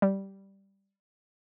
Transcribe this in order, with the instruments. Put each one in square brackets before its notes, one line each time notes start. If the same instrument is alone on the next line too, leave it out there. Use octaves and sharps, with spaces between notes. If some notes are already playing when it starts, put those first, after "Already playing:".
[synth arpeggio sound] G3